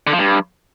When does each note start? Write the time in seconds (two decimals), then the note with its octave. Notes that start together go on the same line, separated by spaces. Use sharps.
0.07 D3
0.13 F3
0.19 G2